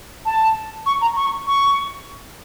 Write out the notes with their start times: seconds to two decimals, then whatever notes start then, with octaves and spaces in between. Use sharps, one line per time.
0.26 A5
0.86 C#6
1.01 A#5
1.16 C#6
1.47 C#6